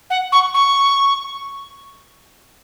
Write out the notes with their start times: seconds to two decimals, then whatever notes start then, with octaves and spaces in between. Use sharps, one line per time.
0.10 F#5
0.32 C#6
0.54 C#6